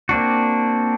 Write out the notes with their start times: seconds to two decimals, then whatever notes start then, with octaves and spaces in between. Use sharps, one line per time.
0.09 A#3 C4 D4 F#4